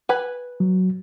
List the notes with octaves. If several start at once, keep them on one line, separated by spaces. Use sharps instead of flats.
B4 G#5 B5
F#3